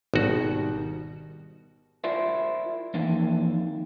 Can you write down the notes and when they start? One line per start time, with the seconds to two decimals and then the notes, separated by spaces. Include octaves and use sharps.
0.14 G#1 B2 D#3 G3 F#4
2.04 E4 F4 A#4 C5 D5 E5
2.94 F2 D#3 E3 A#3 C4